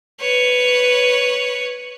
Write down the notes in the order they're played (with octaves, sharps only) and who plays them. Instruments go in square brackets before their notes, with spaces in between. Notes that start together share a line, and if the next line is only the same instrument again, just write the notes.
[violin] B4 C#5